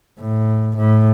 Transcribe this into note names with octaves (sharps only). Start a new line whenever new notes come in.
A2
A2